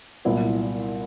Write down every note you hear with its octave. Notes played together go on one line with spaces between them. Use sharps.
C2 A#2 F#3 B3 E4